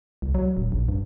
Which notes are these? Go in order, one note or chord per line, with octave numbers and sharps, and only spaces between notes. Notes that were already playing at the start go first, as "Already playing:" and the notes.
C2
F#3
D#1
A#1
G2